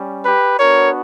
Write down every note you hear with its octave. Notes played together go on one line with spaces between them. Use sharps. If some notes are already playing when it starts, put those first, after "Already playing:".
Already playing: G3 C#4
G4 B4
B3 D4 F#4 A#4 C#5